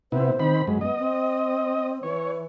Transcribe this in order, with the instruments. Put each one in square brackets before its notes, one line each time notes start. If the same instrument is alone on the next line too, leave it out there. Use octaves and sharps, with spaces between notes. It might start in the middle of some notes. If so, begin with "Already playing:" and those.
[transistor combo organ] C3 B3 E4 [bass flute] C5
[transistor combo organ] D#3 C4 B5
F#2 G#3
[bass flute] B3 [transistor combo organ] D#5
[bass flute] C4
[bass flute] E3 [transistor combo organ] C#5